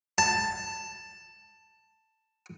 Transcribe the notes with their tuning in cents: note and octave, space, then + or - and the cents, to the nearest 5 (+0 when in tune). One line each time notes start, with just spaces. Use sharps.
A5 +10